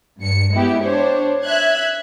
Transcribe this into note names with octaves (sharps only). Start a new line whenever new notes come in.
G2 C#7
G#3 B3 E4 G4
D4 C5 C#5
E5 F#6 G#6